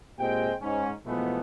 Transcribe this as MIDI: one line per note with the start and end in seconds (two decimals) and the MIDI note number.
0.19 0.51 46
0.19 0.51 56
0.19 0.51 60
0.19 0.51 67
0.19 0.51 79
0.61 0.90 44
0.61 0.90 61
1.06 1.41 47
1.06 1.41 52
1.06 1.41 53
1.06 1.41 56
1.06 1.41 57
1.06 1.41 59